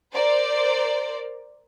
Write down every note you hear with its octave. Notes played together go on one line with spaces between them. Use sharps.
A#4 C5 D5